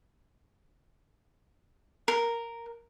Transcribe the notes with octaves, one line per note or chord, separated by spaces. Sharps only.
A#4